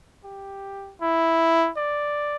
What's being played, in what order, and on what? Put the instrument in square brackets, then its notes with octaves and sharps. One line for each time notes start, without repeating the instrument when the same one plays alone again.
[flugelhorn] G4
E4
D5